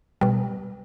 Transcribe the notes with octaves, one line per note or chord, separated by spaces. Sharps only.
B2 G3